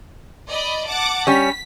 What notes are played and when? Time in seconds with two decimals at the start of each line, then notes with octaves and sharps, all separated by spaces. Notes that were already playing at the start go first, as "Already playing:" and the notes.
0.50 D5 D#5 B5
0.86 F#5 A5 D6
1.27 G3 C#4 B6